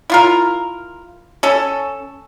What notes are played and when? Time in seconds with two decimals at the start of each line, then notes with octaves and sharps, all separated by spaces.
0.10 E4 F4 A#4
1.43 C#4 A4